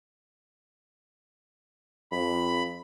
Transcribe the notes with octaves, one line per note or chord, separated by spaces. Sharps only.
F2 B5